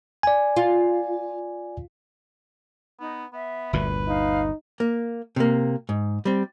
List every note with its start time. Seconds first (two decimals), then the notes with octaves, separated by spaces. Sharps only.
0.23 D5 G#5
0.56 F4
3.00 B3 D#4
3.33 B3 E5
3.73 G1 D2 A#2 B4
4.08 D#4 F5
4.80 A#3
5.36 C3 A#3
5.89 G#2
6.25 G3 C4